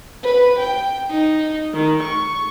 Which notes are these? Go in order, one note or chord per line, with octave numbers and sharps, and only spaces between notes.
B4
G5
D#4
D#3
C#6